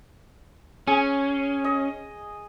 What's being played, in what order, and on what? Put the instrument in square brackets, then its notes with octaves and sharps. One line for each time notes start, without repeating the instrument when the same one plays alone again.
[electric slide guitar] C#4 [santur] G#4
[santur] D#5